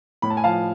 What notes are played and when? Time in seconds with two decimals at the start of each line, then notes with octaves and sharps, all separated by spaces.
0.22 A2 B5
0.30 A5
0.37 G#5
0.44 F3 F5 A5